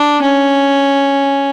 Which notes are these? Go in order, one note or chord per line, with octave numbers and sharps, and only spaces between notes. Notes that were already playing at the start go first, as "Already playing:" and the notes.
Already playing: D4
C#4